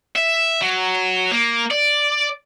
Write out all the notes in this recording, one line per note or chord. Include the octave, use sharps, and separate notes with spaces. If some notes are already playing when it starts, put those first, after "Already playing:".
E5
F#3
A#3
D5